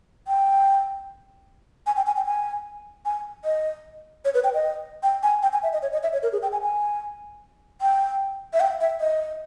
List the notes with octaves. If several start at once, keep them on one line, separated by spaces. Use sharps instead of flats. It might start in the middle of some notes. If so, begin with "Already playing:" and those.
G5
G#5
G5
G#5
G5
G#5
G#5
D#5
C#5
B4
G5
D#5
G5
G#5
G5
G#5
E5
D#5
C#5
D#5
E5
C#5
A#4
G#4
G5
G#5
G#5
G5
E5
G5
E5
D#5